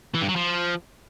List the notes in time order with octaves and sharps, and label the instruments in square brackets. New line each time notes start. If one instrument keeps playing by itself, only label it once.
[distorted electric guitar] E3
G2
F#3
F3